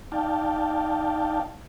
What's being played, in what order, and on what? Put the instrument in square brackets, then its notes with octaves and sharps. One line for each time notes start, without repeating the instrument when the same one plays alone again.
[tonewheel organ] D#4 D5 F5 G5 A5